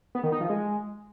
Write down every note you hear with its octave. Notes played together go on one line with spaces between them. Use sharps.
B3
D#3
D#4
F3
G#3